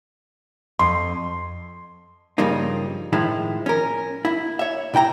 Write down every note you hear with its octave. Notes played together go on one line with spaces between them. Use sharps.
F2 C6
G2 C#3 F3 G3 A#3 D#4
A2 D#3 F3 G#3 E4
C#4 A#4
E4
C#5 E5
C3 E4 G5 A#5